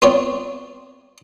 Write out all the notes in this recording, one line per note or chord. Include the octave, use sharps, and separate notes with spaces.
B3 C4 F4 B4 C#5 D5